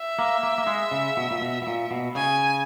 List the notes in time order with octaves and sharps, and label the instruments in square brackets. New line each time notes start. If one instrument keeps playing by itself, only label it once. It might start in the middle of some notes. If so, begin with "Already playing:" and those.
Already playing: [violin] E5
[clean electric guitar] A#3
A#3
A#3
G#3
C#3
B2
A#2
B2
B2
A#2
B2
[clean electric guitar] C#3 [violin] G#5